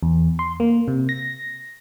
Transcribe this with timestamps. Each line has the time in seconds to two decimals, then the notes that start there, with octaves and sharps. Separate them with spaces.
0.03 E2
0.39 C6
0.60 A#3
0.88 C3
1.09 A#6